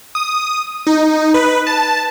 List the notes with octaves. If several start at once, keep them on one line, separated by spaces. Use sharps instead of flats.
D#6
D#4
B4
A5